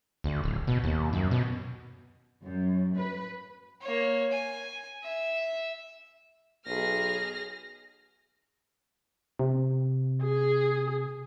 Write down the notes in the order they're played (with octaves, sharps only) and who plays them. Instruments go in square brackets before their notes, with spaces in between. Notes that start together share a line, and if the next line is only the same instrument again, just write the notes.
[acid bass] D2
D1
B2
D#2
F#2
B2
[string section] F#2
B4
[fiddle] A#3 C#5
G#5
E5
[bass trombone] B1 [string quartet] G#4 F6 A#6
[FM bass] C3
[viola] G#4